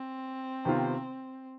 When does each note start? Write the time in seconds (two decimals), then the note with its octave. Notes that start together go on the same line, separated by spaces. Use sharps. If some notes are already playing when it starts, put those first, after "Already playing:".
Already playing: C4
0.65 C3 D#3 B3 F4